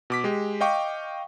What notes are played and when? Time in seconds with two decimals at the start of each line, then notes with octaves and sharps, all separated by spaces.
0.10 B2 D6 B6
0.24 G#3 G4
0.61 D#5 F5 G5 C#6 D6